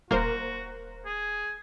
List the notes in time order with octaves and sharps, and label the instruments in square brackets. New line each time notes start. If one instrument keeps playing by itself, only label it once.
[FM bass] D#1 [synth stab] A#3 A#4 C5 [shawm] F#4
[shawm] G#4